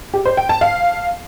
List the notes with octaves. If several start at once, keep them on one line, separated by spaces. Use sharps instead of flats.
G4
C5
G5
A5
F5